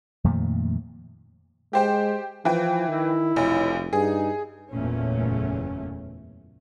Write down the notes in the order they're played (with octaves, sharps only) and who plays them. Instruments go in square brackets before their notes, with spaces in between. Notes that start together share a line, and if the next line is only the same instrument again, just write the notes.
[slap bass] F2 A#2 D#3 A3
[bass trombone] G#3 [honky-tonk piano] G4 C5 G5
[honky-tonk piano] E3 G5 [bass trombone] F3
[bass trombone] D#3 [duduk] E4
[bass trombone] F1 [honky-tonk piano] B1
[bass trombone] G2 [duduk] D#4 [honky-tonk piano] G#4
[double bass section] F#1 E2 A#2 A3 C#4